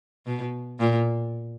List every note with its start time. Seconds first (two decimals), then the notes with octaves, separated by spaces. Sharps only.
0.26 B2
0.79 A#2